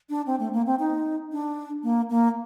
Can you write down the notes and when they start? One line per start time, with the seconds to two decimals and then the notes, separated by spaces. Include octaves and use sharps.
0.10 D4
0.26 C4
0.40 A3
0.53 A#3
0.66 C4
0.79 D#4
1.32 D4
1.83 A#3
2.10 A#3